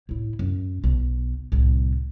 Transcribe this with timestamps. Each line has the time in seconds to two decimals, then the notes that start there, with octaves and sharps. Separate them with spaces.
0.09 A2 E4
0.39 F#2
0.84 B1
1.52 C2 A2